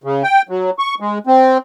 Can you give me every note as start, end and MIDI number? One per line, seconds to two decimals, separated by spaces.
0.04 0.23 49
0.23 0.42 79
0.49 0.70 54
0.79 0.95 85
1.00 1.18 56
1.27 1.58 60